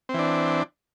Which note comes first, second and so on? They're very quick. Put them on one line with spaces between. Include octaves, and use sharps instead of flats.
C4 E3 D4